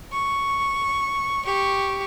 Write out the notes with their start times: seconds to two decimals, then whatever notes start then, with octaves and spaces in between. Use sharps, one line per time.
0.13 C#6
1.45 G4 C#6